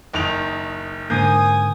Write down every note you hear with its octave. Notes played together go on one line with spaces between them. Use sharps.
F#1 D#3 F7
G#2 D3 A#3 G#5 D#6 G6